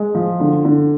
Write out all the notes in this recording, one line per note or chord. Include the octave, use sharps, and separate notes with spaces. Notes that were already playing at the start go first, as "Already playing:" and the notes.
Already playing: G#3
F3
D3
D3